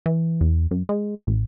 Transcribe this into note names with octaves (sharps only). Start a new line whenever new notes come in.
E3
E2
F#2
G#3
A1